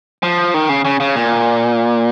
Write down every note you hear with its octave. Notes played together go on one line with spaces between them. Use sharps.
F3
D#3
C#3
C#3
C#3
A#2